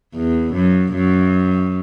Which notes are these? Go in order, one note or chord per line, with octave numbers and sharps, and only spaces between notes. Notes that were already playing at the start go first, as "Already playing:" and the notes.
E2
F#2
F#2